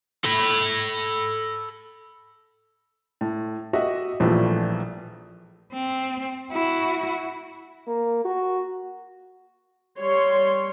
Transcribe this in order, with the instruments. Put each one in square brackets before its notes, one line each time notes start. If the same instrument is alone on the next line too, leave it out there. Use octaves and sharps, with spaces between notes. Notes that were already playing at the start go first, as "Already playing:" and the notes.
[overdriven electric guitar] A4 B5
[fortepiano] A2
F#4 G4 D#5 E5 F#5
A#1 A2 E3 F3 G3 A3
[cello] C4
E4 F#4
[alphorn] A#3
F#4
[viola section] G3 C#5 C6